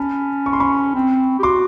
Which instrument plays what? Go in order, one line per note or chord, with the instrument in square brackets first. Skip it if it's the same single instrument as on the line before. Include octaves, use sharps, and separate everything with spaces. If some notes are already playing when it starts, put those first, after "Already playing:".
Already playing: [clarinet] C#4 [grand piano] A5 B5
[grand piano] C#6
C6
B5 C#6
[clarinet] C4
G4
[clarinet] F#4 [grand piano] C6 D6